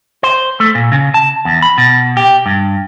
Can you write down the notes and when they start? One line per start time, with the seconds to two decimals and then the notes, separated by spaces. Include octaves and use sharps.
0.23 C5
0.60 A3
0.75 A#2
0.92 C#3
1.14 A5
1.45 E2
1.62 B5
1.78 B2
2.17 G4
2.46 G2